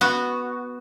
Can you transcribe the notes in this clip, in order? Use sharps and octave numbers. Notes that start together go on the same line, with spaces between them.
B3 F#4